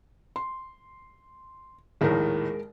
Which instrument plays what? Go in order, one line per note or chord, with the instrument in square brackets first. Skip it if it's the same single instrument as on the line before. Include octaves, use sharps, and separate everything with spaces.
[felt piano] C6
[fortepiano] A#1 D#2 A2 [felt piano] G#3 A#4